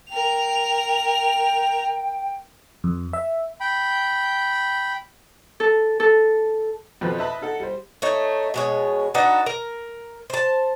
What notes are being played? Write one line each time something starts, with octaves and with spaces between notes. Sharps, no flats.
A#4 G5 F7
F2
E5
G5 B5
A4
A4
F2 B2 F3 B4
B4 D#5 E5 A5 B5
D#4 A4 F#5
G3 C5
A3 D#4 C#5
B2 G#3 C#5
D4 D#4 F#4 B4
A#4
C5 A5